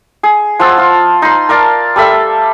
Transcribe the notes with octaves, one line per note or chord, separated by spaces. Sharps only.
G#4
F3 F#5 A5 E6
F4
D#4 C6
A#4 D5 F5 A5
G3 A4 E5 F5